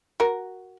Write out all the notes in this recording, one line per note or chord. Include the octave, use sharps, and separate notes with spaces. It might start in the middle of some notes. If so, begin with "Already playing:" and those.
F#4 A#4